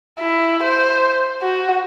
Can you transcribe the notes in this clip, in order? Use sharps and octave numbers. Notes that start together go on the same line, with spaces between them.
E4
C5
F#4